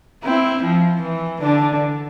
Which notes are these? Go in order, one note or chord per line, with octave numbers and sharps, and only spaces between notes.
C4 E4
F3
E3
D3 D4